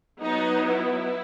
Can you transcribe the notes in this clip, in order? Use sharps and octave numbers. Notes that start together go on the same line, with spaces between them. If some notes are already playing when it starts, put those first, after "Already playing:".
F#3 B3 D#4
E4